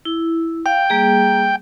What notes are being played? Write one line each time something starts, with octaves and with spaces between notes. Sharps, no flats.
E4
F5 G5
G3 A#3 G#4